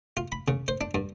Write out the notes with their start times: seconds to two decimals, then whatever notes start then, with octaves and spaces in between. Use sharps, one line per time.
0.17 F4
0.32 B5
0.48 C#3
0.68 C5
0.81 D4
0.95 G2